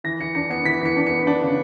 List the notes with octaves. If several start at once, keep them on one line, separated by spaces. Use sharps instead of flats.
E3 A#6
E3 C#7
D4 C#7
B3 C#7
E3 B6
E3 C#7
D4
B3 C#7
D4
C#3